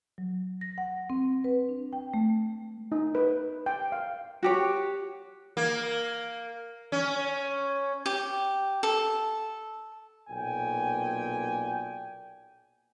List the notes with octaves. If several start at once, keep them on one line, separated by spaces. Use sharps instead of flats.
F#3
A#6
F#5
C4
B4
D4
G5
A3
D#4
B4
G5
F5
F#4 G4 C#5
A#3
C#4
G4
A4
B1 A#2 G5 G#5